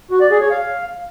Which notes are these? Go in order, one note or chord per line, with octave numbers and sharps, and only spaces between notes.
F#4
D5
G#4
C#5
F5